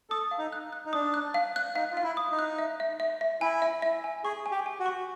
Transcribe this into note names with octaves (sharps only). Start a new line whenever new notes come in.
A4 D#6
F5
D#4
F#6
F#6
D#4
D4 D#6
F#6
F5
F#6
D#4 F5
F4
F5
E4
D#6
D#4
F#6
E5
E5
E5
E5
E4 G#5
E5
E5
G#5
G#4 C#6
G#5
G4
G#5
F#4
C#6